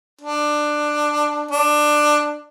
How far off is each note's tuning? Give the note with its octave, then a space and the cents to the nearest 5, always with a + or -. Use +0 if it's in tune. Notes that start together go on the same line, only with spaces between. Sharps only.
D4 +15
D4 +15